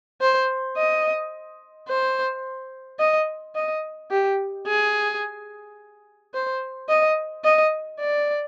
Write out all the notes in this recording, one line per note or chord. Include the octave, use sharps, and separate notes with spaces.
C5
D#5
C5
D#5
D#5
G4
G#4
C5
D#5
D#5
D5